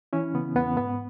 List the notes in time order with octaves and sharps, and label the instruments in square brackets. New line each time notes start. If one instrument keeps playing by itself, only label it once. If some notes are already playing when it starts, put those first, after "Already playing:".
[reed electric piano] E3 C#4 E4
C#3 B3
E2 B3
G#2 B3